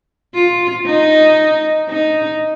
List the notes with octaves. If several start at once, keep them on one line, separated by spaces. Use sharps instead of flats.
F4
D#4
D#4